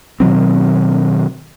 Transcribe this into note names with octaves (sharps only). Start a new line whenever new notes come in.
B2 D#3 F#3 C4